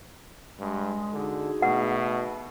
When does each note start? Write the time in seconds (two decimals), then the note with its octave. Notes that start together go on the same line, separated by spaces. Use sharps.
0.59 G2 G#3
1.13 D3 D#4 F#4 G#4
1.62 B2 A3 F#5